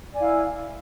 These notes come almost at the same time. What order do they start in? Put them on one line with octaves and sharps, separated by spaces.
D5 G#5 E4 F5